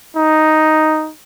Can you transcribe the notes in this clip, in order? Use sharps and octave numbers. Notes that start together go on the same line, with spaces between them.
D#4